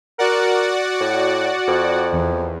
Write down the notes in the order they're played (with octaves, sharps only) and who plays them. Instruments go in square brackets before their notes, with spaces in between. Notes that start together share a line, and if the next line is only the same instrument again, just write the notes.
[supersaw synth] F#4 D5 F#5 [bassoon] A#4
[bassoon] A2
F2
[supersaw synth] E2